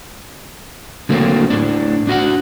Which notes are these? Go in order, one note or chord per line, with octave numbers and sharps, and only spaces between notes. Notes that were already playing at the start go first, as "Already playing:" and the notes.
D3 F#3 A3 A#3 C4
A2 D4
D4 F#4 D#5 F#5